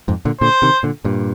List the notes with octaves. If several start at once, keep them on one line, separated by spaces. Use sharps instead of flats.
F2 G#2
A#2 D3
A#2 D3 C5
C3 D#3
A#2 D3
G2 A#2